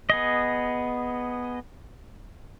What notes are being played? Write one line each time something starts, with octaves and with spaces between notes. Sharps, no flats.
B3 G#4 D#5